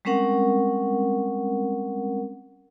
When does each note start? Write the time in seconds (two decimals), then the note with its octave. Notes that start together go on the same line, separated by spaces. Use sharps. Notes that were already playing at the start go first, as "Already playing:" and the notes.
0.05 G3 G#3 C4 C#4 A#4 F#5